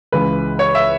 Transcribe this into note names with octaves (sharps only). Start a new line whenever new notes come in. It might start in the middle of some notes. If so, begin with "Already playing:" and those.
C#2 C#3 E3 G#3 B4
C#5
E5